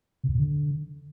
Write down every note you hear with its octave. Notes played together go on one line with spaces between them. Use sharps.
C3
E2
A#2
D3